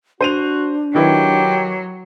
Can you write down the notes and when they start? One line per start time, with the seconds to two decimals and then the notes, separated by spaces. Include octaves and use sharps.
0.21 D4 F#4 C5 D#7 F7
0.95 D#3 F#3 E4 G4 B4